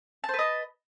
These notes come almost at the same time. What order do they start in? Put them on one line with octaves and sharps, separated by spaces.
A5 C5 B4 D#5